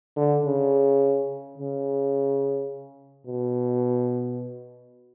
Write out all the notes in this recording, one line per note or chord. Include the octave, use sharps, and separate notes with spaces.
D3
C#3
C#3
B2